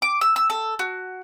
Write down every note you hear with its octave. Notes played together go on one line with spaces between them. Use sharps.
D6
E6
E6
A4
F#4